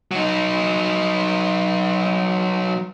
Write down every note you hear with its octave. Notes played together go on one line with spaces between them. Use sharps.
F#3 D#4